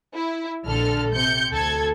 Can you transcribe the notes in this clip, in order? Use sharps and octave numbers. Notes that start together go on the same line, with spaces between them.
E4
A#1 D3 A4 F6
C3 G6 C#7
D2 A4 G#6